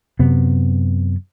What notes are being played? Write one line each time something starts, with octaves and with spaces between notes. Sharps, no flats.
F#2 C3 B3